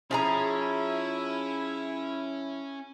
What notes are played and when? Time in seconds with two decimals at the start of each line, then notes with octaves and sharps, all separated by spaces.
0.11 F3 C#4 E4 G#4 A#5